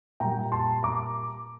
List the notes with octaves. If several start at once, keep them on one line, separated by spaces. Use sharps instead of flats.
A#2 G3 G5 A#5
A5 C6
A#5 D6